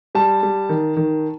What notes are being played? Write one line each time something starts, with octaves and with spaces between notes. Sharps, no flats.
G3 A5
G3
D#3
D#3